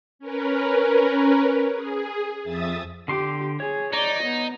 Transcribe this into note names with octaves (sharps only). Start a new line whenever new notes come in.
C#4 A#4 B4
G#4
F2 E5 D#6 A6
D3 G4 C6 D6
G#4 C#5
D#4 D5
B3